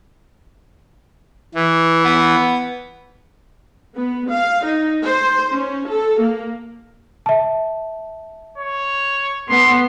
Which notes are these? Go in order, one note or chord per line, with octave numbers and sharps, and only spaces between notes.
E3
B3
B3
F5
D#4
C5
C#4
A4
A#3
E5 A5
C#5
B3 A4 C6